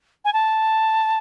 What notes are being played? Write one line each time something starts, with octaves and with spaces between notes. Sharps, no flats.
G#5
A5